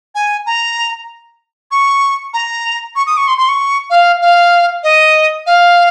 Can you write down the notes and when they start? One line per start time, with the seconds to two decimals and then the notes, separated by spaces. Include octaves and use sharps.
0.15 G#5
0.46 A#5
1.71 C#6
2.34 A#5
2.96 C#6
3.07 D#6
3.17 C#6
3.28 C6
3.38 C6
3.48 C#6
3.90 F5
4.22 F5
4.84 D#5
5.47 F5